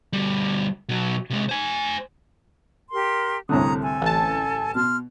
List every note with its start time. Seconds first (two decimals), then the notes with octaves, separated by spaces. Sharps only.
0.13 D2 G3
0.89 B2 F#3
1.30 C3 G#3
1.49 C5 G#5
2.91 G4 A#4 C6
3.49 C2 A2 D3 C#4 A#5 D#6
3.82 A4 G#5
4.02 A1 A5
4.75 B2 C6 F6